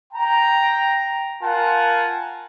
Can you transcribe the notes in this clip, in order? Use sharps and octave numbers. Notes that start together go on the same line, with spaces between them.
G5 A#5
F4 A#4 F#5 G#5 A5